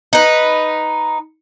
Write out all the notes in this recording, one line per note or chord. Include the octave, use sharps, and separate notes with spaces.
D#4 B4